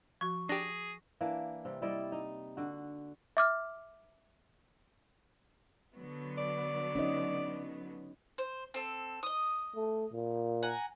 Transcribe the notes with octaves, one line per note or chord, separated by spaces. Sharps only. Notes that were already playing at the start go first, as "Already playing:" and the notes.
F3 F#4 C#6
D4 G4 G#4 A#6
E3 A#3 D4
C3 G3
G3 E4 D5 D#5
D#4
D3 F#4
E5 D6 F6
D3 F#3 B3
D5
C#4 D#4 D#5
C5
C4 A4
D#5 D#6
A3
A#2
F#5 G#5 A#5